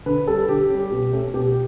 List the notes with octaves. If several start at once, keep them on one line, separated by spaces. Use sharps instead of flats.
D3 B4
G3 C#4 A4
D3 G4
G3 C#4
B2
A3 C#4
B2 G4